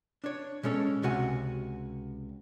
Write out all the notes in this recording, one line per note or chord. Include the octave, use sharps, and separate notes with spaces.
D4 C#5
B2 G#3 C#4 A4 C#5
C#2 C3 F#4 F#5 G#5